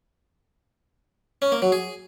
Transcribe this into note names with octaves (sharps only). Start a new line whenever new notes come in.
C#4
A#3
F#3
G#4